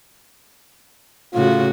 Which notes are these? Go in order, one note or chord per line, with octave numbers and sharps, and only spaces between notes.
A2 C#3 F4 F#4